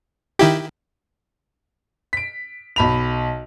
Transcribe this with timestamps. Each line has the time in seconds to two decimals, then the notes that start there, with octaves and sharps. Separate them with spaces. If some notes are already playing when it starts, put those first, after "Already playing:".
0.39 D#3 E4 G4
2.13 B6 D7
2.76 B1 B5 F7